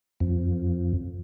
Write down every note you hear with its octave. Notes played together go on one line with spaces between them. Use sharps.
F2